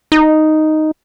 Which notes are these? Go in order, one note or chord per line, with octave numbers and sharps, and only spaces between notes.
D#4